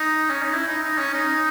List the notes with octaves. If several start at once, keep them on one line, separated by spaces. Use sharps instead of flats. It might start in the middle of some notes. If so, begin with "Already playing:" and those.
Already playing: D#4
C#4
D#4
E4
D#4
D#4
C#4
D#4